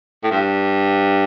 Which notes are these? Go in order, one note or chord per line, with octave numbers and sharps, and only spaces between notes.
A2
G2